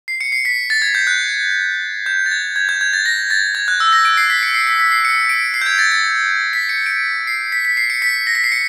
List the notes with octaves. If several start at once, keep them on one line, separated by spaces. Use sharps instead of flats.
C7
C#7
C7
B6
A6
G#6
G6
F#6
G6
A6
G#6
G#6
G6
G#6
A6
A#6
A6
G#6
F#6
E6
A#6
D7
C7
B6
C#7
C7
B6
B6
C7
C#7
D7
C7
G6
G#6
A6
A6
B6
C#7
D7
C7
B6
B6
C7
C#7
B6
A#6
B6
C7
C#7